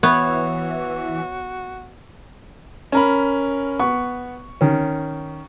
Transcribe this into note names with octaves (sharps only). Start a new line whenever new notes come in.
E3 B3 F#4 C#5
C#4 A#4 B5
B3 C#6
D#3 C#4